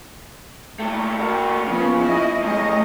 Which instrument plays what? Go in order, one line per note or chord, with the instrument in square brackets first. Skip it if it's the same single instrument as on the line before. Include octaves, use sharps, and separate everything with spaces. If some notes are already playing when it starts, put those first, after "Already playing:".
[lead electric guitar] A#2 A3
A#3 F#4
[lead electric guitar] C#3 [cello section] F3 A#3 B3
[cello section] E4 D#5
[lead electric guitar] E2 A2 [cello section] G#3 A3 D#5